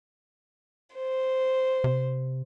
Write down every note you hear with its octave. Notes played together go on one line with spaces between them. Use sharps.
C5
C3